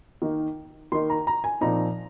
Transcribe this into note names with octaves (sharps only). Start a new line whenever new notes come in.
D#3 A#3 D#4
D#3 A#3 D#4 C6
A#5
A#5
G#5
A#2 F3 C4 D#4 A#5